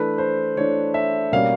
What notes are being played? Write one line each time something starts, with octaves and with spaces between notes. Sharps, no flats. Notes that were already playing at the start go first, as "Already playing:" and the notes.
Already playing: E3 A3 D4 B4
C5
E3 A3 D4 C#5
E5
B2 G3 A#3 C#4 F5